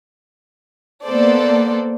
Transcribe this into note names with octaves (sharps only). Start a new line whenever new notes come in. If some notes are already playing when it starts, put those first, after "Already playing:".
A#3 B3 A4 C5 D5